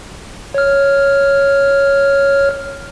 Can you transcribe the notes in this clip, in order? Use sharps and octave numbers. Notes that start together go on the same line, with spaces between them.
C#5 F6